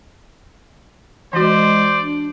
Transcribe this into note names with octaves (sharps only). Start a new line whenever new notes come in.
E3 G#3 F#4 C5 D5
D4